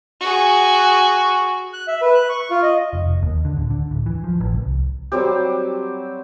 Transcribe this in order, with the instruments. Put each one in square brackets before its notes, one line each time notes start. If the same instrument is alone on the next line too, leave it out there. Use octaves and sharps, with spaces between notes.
[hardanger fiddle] F#4 G#4
[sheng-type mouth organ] F#6
E5
B4
F#6
C#6
F4
D#5
[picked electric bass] F1
F1
D#2
D3
D1
D3
D1
E3
F3
A1
C2
[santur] F#3 G3 C4 G4